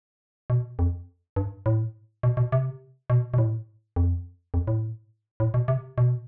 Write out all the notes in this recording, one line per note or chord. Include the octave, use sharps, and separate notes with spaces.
B2
F2
G2
A2
B2
B2
C3
B2
B2
A2
F2
F2
A2
A2
B2
C3
B2